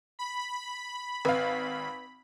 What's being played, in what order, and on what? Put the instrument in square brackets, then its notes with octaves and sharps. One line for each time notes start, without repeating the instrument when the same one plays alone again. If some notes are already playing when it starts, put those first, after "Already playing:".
[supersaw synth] B5
[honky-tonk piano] G#1 F5 [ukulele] B4